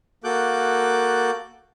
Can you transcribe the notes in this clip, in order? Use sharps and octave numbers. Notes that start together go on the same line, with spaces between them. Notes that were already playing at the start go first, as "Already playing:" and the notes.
A#3 F#4 A4 D6 F#6 G6